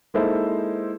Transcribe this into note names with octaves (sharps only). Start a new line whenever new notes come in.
G#3 A#3 D#4 E4 A4 C5